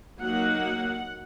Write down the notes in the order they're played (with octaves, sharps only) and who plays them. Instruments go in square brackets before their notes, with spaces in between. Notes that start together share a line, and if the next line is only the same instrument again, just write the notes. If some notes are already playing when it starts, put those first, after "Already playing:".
[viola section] F#3 A#3 D#4 F#5